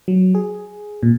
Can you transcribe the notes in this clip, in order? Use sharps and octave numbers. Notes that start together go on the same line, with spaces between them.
F#3
G#4
A#2